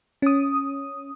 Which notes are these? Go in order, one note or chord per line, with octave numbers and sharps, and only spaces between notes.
C#4 D#6